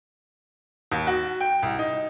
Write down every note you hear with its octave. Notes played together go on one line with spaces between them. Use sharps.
D#2
F#4
G5
C2
D#4